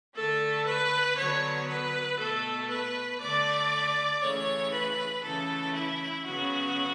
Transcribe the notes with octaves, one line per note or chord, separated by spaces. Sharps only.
D3 A3 A4
B4
D3 F#3 B3 C#5
B4
B2 A3 A4
B4
D3 A3 D5
C#3 E3 A3 C#5
B4
C#3 E3 A3 A4
E4
C#3 F#3 B3 F#4